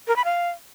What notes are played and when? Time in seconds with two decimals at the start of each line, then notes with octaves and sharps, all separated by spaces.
0.08 A#4
0.16 B5
0.25 F5